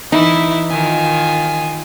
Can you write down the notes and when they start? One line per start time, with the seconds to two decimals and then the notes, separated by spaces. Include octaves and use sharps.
0.12 E3 D#4 E4
0.71 D#3 F4 G#5